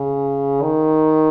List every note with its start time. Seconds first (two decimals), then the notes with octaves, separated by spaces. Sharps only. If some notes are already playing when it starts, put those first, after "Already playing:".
Already playing: C#3
0.62 D#3